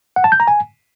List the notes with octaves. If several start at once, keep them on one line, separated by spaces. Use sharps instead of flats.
F#5
A5
G6
A#5
G#5